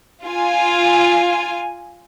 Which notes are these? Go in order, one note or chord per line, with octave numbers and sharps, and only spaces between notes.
F4 G#5